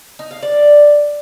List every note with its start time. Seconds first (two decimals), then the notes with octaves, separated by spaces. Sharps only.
0.19 D#4
0.31 F5
0.43 D5